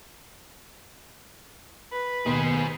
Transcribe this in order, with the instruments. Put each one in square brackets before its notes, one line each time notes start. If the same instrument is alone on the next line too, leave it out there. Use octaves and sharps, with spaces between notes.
[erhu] B4
[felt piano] D#2 B2 [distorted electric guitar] G#4 C5